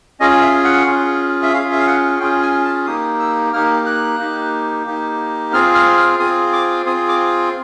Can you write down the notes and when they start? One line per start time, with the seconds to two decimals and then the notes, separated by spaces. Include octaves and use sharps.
0.20 C#4 F4 G#4 D#5
0.42 E5
0.64 F#5
0.87 C#4 F4 G#4
1.43 E5
1.53 C#4 F4 G#4 F5
1.72 E5
1.79 F5
1.87 F#5
2.20 C#4 F4 G#4 G5
2.42 G#5
2.64 A5
2.86 A#3 D#4 G4 D#6
3.20 E6
3.53 A#3 D#4 G4 F6
3.86 F#6
4.19 A#3 D#4 G4
4.86 A#3 D#4 G4
5.53 C4 F4 G#4 F6
5.75 F6
5.98 F6
6.19 C4 F4 G#4 D#6
6.53 D6
6.86 C4 F4 G#4 D#6
7.09 D6